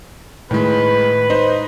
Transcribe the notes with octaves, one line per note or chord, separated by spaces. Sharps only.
A2 D#3 G#3 B4
D#4 C5 D#5